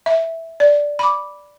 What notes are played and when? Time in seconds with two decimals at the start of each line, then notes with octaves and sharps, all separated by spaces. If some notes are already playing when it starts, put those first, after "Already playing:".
0.06 E5
0.60 D5
0.99 B5 D6